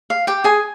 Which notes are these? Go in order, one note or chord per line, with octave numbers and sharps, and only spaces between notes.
F5
G4 G5
G#4 G#5